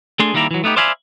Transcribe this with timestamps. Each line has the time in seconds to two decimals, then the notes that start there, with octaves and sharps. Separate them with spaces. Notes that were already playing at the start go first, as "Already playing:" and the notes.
0.19 A3 D4 G#4 C6
0.34 D#3 G3 A#3 E4 A#5
0.51 E3 F#3
0.64 A3 B3 D#4 G4
0.76 C5 D5 E5 F5 G#5 B5